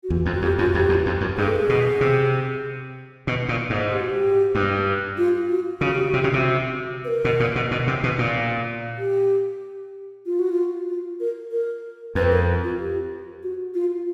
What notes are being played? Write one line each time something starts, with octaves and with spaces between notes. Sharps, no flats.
F#4
E2 F4
F2
F#4
F2 G4
F#2 F4
F#4
F2 G4
E2
F2
F#2
G2 G#4
A4
G#4
B2
C3
B2
A#2
G#2
G4
F#4
G4
G2
F4
F#4
C#3 F#4
G4
F#4
C3
C#3 G4
C3 F#4
B4
A#4
B2
A#2
B2
B2
C3
B2
A#2
G4
F4
F#4
F4
F4
A#4
A#4
F2 B4
A#4
F4
G4
F#4
F4